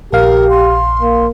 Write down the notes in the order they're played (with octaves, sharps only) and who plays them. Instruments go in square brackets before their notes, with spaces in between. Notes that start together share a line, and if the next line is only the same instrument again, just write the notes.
[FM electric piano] A#1 F5 [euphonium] G4 [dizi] A#4
[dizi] C6
[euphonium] A#3